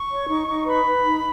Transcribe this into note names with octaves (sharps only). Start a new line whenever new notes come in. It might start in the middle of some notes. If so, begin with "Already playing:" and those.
Already playing: C#6
C#5
D#4
D#4
B4 B5
B4
D#4